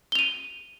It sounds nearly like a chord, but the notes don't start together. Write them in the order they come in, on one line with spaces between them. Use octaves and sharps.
G7 F7 D#7